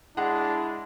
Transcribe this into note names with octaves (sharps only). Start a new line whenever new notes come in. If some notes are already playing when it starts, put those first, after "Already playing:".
G#3 D4 E4 F#5